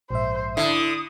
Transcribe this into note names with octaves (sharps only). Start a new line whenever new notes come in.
A#1 G#2 C5 E5
D3 E4 D#6